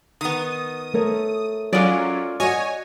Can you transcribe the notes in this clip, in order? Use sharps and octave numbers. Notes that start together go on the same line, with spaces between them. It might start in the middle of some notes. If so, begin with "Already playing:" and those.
D#3 B3 D#6
A3 A#4 C#5
F#3 G#3 C#4 F4 D5
F#4 C#5 D#5 F#5 G#5